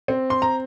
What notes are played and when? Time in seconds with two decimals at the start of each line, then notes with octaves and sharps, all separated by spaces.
0.08 C4
0.30 C6
0.42 A#5